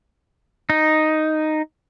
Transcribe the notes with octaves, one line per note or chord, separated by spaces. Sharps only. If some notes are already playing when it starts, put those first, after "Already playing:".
D#4